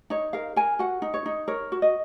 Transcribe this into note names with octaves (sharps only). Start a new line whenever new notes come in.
D#4 C#5
A#4 F5
A#4 G#5
F#4 F#5
D#4
C#5
D#4
A#4 C#5
F#4
D#5